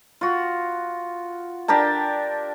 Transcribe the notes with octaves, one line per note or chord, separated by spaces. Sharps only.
F4 F#4
D4 G4 A#4 A5